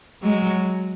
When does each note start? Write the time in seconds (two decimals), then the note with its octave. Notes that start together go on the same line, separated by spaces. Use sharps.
0.23 F#3 G#3